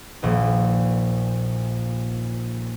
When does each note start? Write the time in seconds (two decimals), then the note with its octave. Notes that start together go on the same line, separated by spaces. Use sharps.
0.22 D#1 A#1 A#2